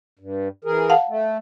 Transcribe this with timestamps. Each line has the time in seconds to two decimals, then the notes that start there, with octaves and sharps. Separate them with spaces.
0.19 G2
0.65 E3 G#4 A#4
0.90 F5 F#5 A5
1.08 A3